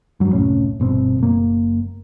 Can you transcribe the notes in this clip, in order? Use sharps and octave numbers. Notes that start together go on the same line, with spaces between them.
G2 F#3
F#1 C2 A2 C#4
G1 B2 C4
F#1 A#3